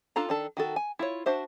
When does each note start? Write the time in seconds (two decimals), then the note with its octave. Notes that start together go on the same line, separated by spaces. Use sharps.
0.16 D4 F4 A4 A#5
0.29 D#3 D4 A4
0.57 D#3 F#4 A4
0.76 G#5
0.99 E4 F4 C#5
1.26 D4 F#4 C5 E5